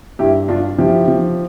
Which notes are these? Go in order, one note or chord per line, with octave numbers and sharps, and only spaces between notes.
G2 E4 G4
G2 D4 F4
F3 E4 G4
F3